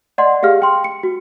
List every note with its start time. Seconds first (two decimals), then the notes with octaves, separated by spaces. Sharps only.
0.18 D5 D#5 F#5 C6
0.43 G4 G#4 F5 F6
0.62 G5 C6
0.84 C#7
1.03 F#4